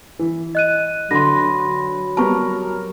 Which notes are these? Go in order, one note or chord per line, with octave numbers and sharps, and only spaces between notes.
E3
D#5 F#6 D#7
D3 F#3 B4 C6 A#6
G3 B3 A#4 A5 C#6